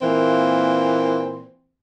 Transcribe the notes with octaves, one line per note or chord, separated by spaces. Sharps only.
A#2 E3 A#3 C4